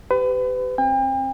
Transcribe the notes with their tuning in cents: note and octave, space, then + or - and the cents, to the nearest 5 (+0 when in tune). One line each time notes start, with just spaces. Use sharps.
G4 +0 B4 +35
C4 +25 G5 +40